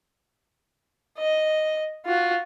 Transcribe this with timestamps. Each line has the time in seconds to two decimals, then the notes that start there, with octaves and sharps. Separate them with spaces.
1.18 D#5
2.06 F4 F#4